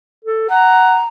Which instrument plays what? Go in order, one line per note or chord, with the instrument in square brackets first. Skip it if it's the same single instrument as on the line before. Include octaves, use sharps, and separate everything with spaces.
[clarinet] A4
[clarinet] F#5 [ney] A#5